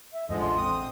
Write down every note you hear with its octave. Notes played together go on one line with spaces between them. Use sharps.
E5
E2 G#2 D3 F3 G#3 D#5
A1 C6
C4 D#6